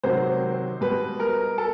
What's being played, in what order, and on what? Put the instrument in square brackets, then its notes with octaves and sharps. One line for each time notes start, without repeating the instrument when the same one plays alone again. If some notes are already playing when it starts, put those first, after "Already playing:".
[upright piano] C3 D#3 F#3 C5
B2 G3 B4
A#4
A4